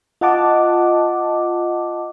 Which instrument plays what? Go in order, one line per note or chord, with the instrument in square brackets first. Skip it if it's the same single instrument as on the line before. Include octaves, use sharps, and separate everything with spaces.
[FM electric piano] F4 D#5 F#5 A5 D6